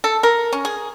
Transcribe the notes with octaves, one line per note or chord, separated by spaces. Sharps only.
A4
A#4
C#4
G#4